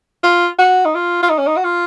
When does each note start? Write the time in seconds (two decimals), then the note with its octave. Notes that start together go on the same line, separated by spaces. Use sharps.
0.23 F4
0.58 F#4
0.85 D#4
0.95 F4
1.23 F4
1.30 D#4
1.39 C#4
1.47 D#4
1.57 F#4
1.64 F4